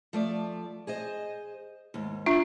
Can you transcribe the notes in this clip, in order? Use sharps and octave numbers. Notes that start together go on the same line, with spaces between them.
F3 A3 D5
G#4 C5 D#5
D#2 G#2
D4 F4 E5